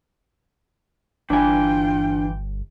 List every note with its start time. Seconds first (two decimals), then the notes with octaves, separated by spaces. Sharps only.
1.30 G1 E3 D4 F4 G5 G#5